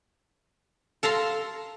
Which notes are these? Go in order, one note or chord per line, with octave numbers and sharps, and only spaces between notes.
A4 F5 A#5 C6